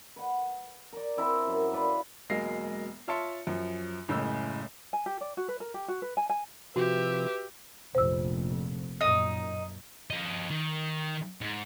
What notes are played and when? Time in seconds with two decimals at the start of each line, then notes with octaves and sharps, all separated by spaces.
0.16 B4 F#5
0.93 A#4 D5
1.17 C4 E4 A#4 E5
1.47 F#2 A#5
1.73 B4 D5 F5 C6
2.30 E1 F#3 G#3 A#3 A#6 C7
3.08 F4 C#5 E5 A5 C6 C#7
3.47 F#2 F3
4.08 F#1 A2 C#3 G#3 E6
4.93 G#5
5.06 G4
5.21 D5
5.37 F#4
5.48 B4
5.60 A#4
5.74 G4
5.88 F#4
6.02 B4
6.17 G#5
6.29 G#5
6.76 C3 F3 F#4 G4 B4 E5
7.95 F1 A#1 F2 C5 E6
9.01 F#2 A#2 D#4 D#5
10.10 F3 D#5
10.50 D#3
11.41 G#2